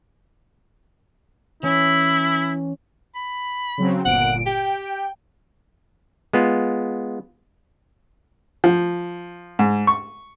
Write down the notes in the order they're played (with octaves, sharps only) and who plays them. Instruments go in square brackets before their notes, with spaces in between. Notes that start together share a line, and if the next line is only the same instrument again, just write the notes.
[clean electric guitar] E3 C#4 [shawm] E4
[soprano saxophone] B5
[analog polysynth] C#3 F#3 C4
[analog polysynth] G1 A#2 D7 [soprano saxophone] F#5
[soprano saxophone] G4 [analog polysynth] G5
[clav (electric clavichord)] G#3 B3 F4
[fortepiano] F3
G#2
C#6